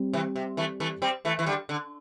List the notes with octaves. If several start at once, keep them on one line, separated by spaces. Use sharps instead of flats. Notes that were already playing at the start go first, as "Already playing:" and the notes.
Already playing: G3 C4 G4
C3 E3
C3
E3 A3
E3 A3
G3 C4
E3 A3
E3
D3 G3
D3